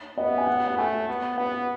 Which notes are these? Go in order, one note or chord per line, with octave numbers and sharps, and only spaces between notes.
B3 D#5
E5
G#5
F#5
F#5
F#5
A3 G#5
B3
B3 F#5